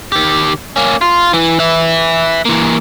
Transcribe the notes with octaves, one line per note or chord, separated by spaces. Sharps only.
D#3 G4
A#3 C#4
F4
E3
B4 E5
E3 A#3